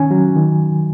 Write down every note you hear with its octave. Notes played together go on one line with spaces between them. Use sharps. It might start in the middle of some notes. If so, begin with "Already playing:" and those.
Already playing: D#3 C#4 G#5
F#3
D#3